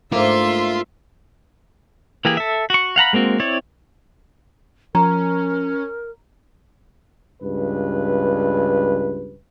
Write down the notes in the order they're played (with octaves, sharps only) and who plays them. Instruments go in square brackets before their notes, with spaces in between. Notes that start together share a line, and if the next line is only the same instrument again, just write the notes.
[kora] G#2 A#3 [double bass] A3 D4 [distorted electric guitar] F4 [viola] E5 C6
[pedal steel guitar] E3 A#3 E4 G4 G#4
A4 E5
F#4 C#6
F5 F#5 A#5 B5
G#3 A#3 C4 F#4
C4 E4 C#5 D5
[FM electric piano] F3 [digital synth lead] C#4 [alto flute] A#4 [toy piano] A#5
[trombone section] C#2 G2 B4